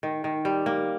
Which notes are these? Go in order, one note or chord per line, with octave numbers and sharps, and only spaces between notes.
D#3
D#3
G3
A#3